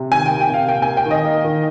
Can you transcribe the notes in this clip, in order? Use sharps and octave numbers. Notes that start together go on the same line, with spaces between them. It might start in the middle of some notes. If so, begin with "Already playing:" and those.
Already playing: C3
D#3 G#5
G5
A#3
G5
C3 F5
A#3 G5
A#3 G#5
G5
D#3
D#5
A#3
D#3